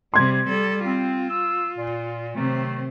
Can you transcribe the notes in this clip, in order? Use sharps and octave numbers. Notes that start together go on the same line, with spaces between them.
C3 G3 C6 G#6
G3 A4
C4 F4
E6
A#2
C3 D#3 F#3 A3 C4